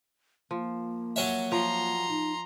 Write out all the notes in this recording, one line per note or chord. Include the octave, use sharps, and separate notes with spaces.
F3 A#3
F#3 C#4 E5
F3 A#5 C6
D#4